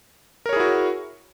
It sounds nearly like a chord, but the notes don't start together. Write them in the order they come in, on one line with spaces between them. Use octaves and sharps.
A#4 C#5 G#4 E4 F#4